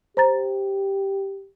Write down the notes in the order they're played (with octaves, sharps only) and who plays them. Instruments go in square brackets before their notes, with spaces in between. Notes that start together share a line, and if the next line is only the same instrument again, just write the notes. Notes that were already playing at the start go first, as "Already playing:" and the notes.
[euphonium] G4 [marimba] C5 A#5 A6